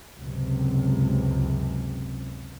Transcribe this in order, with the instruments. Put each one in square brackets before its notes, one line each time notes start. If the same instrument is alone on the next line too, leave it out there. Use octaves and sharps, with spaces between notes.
[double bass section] C#2 F#2 C3